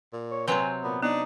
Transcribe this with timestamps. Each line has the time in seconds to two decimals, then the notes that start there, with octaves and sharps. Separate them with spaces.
0.13 A#2
0.31 C#5
0.48 C3 F#3 C4 B4 G#5 C6
0.84 A#2 B3
1.02 B3 D4 D#4